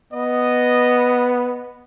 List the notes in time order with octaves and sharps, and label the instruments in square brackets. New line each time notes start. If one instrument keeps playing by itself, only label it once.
[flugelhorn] B3 [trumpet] D#5